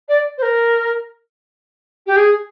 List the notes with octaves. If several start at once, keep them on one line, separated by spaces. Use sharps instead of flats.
D5
C5
A#4
G4
G#4